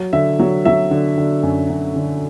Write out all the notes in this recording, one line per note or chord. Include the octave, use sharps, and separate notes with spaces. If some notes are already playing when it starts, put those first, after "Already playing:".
Already playing: F#3
D3 E5
F#3
F#3 E5
D3
D3
F#2
F#2
D3